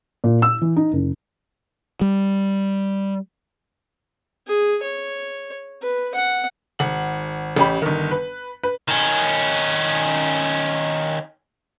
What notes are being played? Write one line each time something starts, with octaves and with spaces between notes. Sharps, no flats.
A#2
E6
E3
D#4
F#1
G3
G#4
C#5
B4
F#5
G#1 F#5 F#7
A1 C#4 G4 B5
G1 D#3
B4
B4
D#3 C#4